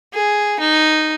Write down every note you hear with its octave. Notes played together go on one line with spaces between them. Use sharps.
G#4
D#4